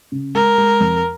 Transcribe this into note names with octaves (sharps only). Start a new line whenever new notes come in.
C#3
G#3 A#4
G#3
F2